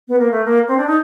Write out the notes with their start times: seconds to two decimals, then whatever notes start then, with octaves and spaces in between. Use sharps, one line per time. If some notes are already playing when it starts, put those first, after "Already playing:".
0.08 B3
0.19 A#3
0.31 A3
0.45 A#3
0.68 C4
0.77 D4
0.87 D#4